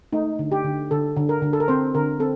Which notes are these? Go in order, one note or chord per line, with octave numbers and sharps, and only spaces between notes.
A3 D#4
D3
G4
D3
D3 A4
D3
A#4
D3
A4
A#4
C4 C5
D3 A#4
C4 A4